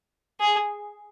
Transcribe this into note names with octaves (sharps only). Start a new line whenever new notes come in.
G#4